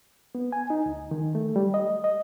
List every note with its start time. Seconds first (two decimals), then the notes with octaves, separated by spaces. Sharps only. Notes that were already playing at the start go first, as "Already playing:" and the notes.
0.35 B3
0.53 G#5
0.70 D#4
0.86 D2
1.11 D#3
1.35 A3
1.56 G3
1.74 D#5
2.04 D#5